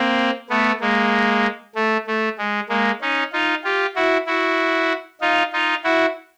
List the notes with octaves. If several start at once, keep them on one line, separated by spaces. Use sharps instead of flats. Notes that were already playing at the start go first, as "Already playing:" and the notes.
Already playing: A#3 C4
A3 B3
G#3 A#3
A3
A3
G#3
G#3 A#3
C#4 D#4
D#4 F4
F4 G4
E4 F#4
E4 F#4
D#4 F4
D#4 F4
E4 F#4